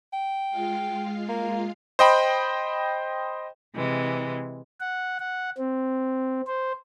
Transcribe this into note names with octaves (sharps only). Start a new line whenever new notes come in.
G5
G#3 F4 F5
A#3
C5 D#5 G5 B5
C3 E3 G#3
F#5
F#5
C4
C5